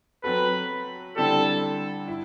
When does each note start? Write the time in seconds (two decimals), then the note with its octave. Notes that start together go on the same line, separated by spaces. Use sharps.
0.23 F#3 C4 F#4 A4 B4
1.16 D3 G3 C4 E4 G4 A4
2.08 E4